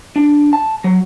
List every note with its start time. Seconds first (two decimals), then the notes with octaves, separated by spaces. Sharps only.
0.16 D4
0.53 A5
0.84 F#3